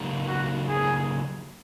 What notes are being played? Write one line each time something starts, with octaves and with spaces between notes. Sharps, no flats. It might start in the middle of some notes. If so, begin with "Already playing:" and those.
Already playing: C#3 F#3 A#3 D#4 G4
F#4
G#4